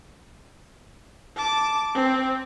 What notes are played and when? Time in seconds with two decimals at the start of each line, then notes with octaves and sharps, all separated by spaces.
1.36 A5 D6
1.95 C4